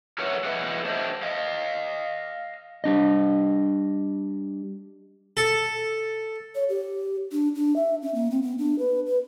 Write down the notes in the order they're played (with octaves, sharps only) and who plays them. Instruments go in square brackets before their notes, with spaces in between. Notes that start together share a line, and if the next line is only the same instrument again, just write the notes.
[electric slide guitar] G#4 A#4 B4 C#5 E5 F#5
G#4 B4 D#5 E5 F#5
D4 C5 D#5 E5
D#5 F5
[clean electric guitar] G3 D4 D#5
[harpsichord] A4
[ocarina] C#5
G4
D4
D4
E5
C#4
A#3
C4
B3
D4
B4
B4